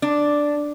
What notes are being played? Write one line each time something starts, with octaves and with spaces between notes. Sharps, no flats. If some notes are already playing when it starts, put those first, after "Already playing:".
D4